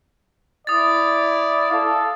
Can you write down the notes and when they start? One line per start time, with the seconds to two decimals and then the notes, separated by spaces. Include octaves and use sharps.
0.67 E4 D5 D#6 A6
1.70 A4 F5